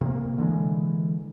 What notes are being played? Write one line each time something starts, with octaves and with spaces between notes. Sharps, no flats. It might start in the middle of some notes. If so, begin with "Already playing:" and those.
C3 A#3
D3 E3 G3 G#3